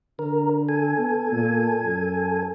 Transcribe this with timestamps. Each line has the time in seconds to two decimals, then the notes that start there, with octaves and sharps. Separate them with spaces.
0.19 D3 A#4
0.69 A4 G#5
0.98 B3
1.32 A#2
1.82 F#2